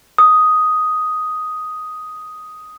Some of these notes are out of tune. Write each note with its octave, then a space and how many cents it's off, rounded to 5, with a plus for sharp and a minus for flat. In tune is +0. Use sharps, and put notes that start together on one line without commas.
D#6 +5